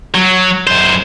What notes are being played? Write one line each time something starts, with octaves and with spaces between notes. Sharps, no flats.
F#3
F#2 C5